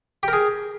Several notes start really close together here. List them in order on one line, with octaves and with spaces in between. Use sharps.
G4 A#4 G#4